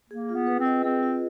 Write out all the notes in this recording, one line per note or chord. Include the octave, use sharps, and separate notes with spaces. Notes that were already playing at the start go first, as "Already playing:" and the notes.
A#3 G#4
F4
B3
B4
C4
D#5
C4 G#4
F4